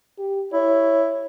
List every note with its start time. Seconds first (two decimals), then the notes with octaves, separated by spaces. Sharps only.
0.19 G4
0.53 E4 C#5